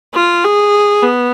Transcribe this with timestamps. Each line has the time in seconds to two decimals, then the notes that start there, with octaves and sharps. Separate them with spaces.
0.15 F4
0.44 G#4
1.03 B3